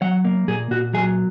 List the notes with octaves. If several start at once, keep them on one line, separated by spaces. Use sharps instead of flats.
F#3 F#5
A#3
A#2 G#4
A#2 F#4
F#3 G#4